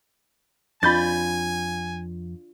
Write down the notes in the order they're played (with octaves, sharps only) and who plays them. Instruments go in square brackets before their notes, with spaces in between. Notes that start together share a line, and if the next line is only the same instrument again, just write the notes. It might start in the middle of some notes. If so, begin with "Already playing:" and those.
[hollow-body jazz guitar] F2 [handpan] D4 F4 [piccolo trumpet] G#5 [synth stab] B5 G6 A6